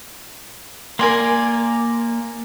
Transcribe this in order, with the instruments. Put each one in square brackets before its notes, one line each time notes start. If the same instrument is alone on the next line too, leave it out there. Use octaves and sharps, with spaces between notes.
[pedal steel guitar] A#3 D5 [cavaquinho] A#4 G#5 C6